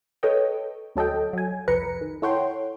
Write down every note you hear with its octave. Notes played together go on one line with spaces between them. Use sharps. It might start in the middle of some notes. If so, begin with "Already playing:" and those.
A4 B4 C#5 D#5 G5
D2 F#3 A4 D#5 G5
F#3 G#5
C2 F2 B4 A#5 C#7
D#3
E4 A4 C#5 F#5 G5 C6